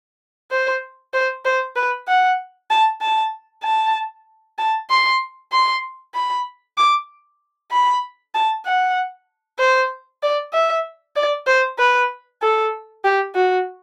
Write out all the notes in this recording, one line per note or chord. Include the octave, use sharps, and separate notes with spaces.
C5
C5
C5
B4
F#5
A5
A5
A5
A5
C6
C6
B5
D6
B5
A5
F#5
C5
D5
E5
D5
C5
B4
A4
G4
F#4